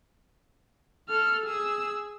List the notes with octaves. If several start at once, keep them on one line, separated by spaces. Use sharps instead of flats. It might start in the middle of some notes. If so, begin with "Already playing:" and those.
A4 F6
G#4 E6